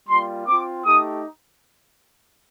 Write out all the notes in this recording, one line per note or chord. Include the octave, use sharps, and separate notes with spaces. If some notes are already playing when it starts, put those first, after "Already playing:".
G3 A#3 F4 C6
C4 F4 D6
A3 D#4 G4 D#6